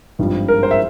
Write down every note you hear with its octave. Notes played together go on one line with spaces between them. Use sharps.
G#1 G2 F3
A#4
C5
E5